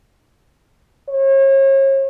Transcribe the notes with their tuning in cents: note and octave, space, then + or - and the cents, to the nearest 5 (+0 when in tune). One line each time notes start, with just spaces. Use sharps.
C#5 -40